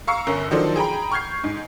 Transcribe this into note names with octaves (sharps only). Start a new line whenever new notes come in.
F5 A#5 C#6 E6 C7 C#7
G1 C#4 A#4 E6
D#3 F3 F#3 D4 A4 C5
G#4 G5 A#5 B5
C#6 F6 G6 G#6 C7
G#2